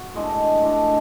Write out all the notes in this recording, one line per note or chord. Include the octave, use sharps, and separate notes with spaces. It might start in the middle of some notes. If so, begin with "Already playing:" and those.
Already playing: F#4
A2 G#3 D4
A2 G#3 D4